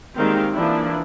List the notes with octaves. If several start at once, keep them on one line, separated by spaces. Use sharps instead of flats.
D#3 G3 G#3 A#3 C4 F5
E3 F3 A#3 D4 E4